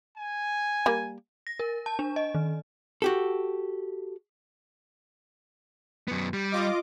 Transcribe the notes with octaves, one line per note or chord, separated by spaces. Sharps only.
G#5
G3 A#3
A#6
A#4
A5
D4
D#5
D#3
F#4 G4 A4
F#2 B3
G3
F4 D#5 D6